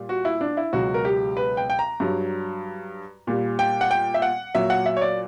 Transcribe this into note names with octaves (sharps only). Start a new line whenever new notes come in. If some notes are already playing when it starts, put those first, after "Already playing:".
Already playing: A#2 G3
F#4
E4
D4
E4
C#2 B2 F#3 F#4
A#4
G4
B4
G5
G5
A#5
G2 F#3
A#2 G3
G5
F#5
G5
E5
F#5
A#2 F#3 E5
F#5
E5
C#5
D5